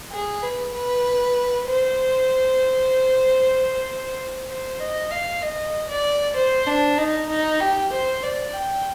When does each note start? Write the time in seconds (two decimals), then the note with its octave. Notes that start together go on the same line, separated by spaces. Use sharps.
0.12 G#4
0.42 B4
0.74 B4
1.67 C5
4.48 C5
4.80 D#5
5.11 F5
5.42 D#5
5.89 D5
6.36 C5
6.67 D4
6.98 D#4
7.29 D#4
7.60 G4
7.92 C5
8.23 D5
8.54 G5